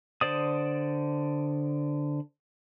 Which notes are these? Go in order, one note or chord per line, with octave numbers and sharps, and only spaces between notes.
D3 C5 D5 D#6